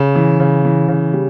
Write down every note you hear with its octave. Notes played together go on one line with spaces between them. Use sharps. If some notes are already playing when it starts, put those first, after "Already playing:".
Already playing: C#3
E3
C#3
E3
C#3
G3